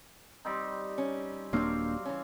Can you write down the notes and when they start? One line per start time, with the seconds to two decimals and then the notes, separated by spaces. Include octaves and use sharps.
0.45 G3 C4 D#4
0.98 C#4
1.53 D#1 F#3 G3 A#3 C4 D4 F5 D6
2.05 E3 C#4